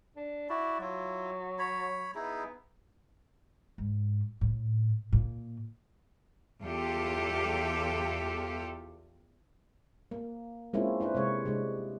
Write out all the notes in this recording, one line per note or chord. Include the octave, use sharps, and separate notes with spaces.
D4
E4 F#4 D5
F#3 E4 F4
C#5 B5
B3 D#4 E4 G#4
G#2
A2
A#2
E2 F4 G4 A4
A#3
G#3 A#3 C4 C#4 E4 F4
D4 E4 B4 C5
C3 G#3 C#5
C3 G#3 D4